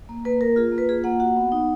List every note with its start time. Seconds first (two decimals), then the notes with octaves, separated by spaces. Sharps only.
0.09 A#3
0.25 A#3 B4
0.41 A#3 A#4
0.56 F4 G#4
0.72 A#3
0.78 B4
0.89 F4 G#4
1.04 A#3 F#5
1.20 F#4 F#5
1.36 B3
1.52 D#4